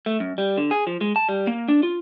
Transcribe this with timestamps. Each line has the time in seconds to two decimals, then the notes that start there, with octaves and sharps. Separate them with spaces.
0.06 A3
0.20 F#2
0.38 G3
0.57 D3
0.71 G#4
0.87 F3
1.01 G#3
1.16 A5
1.29 G3
1.47 A#3
1.68 D4
1.83 F4